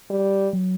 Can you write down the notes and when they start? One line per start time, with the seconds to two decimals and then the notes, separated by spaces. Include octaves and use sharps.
0.10 G3
0.53 F#3